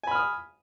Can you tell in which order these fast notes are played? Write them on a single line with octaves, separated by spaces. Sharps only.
G#5 B5 F6 D#6